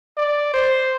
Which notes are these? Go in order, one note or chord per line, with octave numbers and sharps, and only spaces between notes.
D5
C5